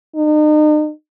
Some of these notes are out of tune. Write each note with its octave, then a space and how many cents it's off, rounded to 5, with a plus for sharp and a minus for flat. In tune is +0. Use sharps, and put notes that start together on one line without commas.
D#4 -40